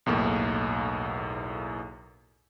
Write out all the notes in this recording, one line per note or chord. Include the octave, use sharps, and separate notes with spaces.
B1 E2 A2 A#3